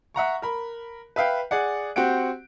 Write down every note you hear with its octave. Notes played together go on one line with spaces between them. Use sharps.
E5 F#5 A#5 C#6
A#4 B5
B4 E5 F5 G5
G#4 D5 F#5
C4 F#4 G4 F#5 D7